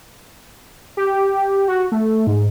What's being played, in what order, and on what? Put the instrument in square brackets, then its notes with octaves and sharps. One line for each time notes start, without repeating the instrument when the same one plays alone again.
[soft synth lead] G4
F#4
A3
G#2